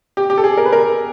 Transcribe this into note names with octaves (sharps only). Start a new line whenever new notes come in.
G4
G4
A4
G#4
A#4
B4
A#4